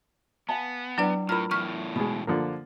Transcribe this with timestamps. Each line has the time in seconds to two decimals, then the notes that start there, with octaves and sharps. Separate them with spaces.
0.49 B3 F5 G#5 A5
0.98 F#3 D4 E4 B4 D5 G5
1.29 A2 E4 F4 A#4 B5 F6
1.51 E2 A2 C#6 F6
1.96 B2 G#3 D#6
2.27 D3 F3 A#3